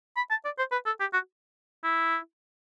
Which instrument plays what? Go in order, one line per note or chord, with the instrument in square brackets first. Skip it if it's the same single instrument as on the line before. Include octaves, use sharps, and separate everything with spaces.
[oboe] B5
A5
D5
C5
B4
A4
G4
F#4
E4